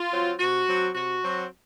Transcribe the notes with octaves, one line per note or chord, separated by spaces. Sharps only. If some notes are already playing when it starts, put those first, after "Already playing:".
Already playing: F4
F#3 C4
C3 F#4
F#3 C4
C3 F#4
F#3 C4